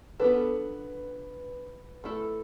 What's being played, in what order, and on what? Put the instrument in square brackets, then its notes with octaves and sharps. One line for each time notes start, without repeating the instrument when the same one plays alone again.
[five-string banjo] B3 D4 A4 [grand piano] B4
[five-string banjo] A3 E4 A4